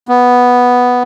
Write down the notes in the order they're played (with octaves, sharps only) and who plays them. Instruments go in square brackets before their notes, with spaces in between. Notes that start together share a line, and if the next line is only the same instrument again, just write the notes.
[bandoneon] B3